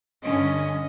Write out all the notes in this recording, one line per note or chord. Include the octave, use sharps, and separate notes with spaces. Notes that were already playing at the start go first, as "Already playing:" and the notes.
G2 D3 C#4 D#5